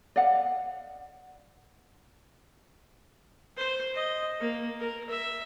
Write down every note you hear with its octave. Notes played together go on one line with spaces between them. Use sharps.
D5 D#5 F5 F#5
C5
D#5
A#3
A#4
E5